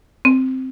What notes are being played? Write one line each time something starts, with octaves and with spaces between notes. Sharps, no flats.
C4